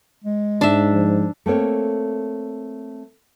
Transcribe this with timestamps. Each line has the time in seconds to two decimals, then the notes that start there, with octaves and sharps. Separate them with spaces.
0.24 G#3
0.61 G#2 D4 E5
0.92 F3
1.46 A3 A#3 C4 C#5